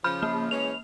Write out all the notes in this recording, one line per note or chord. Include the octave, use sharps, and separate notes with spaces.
C#3 F3 B5 F6 G6
A#3
E3 G#3 C#4 F7